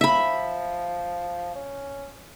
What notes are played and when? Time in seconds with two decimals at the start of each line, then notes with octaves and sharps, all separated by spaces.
0.01 F3 E5 B5
1.55 C#4